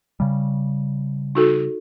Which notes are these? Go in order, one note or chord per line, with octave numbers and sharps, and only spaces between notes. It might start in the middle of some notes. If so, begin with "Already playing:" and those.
C#3 G3
D#4 F#4 A4